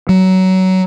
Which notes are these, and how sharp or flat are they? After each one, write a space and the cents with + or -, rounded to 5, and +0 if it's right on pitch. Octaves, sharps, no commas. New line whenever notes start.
F#3 +20